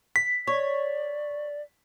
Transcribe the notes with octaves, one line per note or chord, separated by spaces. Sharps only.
B6
C#5 D5